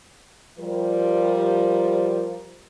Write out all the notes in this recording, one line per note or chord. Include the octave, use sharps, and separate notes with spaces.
F3 G3 A#4